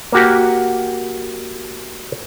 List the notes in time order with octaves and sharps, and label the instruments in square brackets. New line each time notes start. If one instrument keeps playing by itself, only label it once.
[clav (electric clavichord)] A#3 F#4 G4